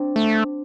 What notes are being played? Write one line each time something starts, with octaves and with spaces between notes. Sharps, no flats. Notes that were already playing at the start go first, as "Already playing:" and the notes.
Already playing: C4 D4
A3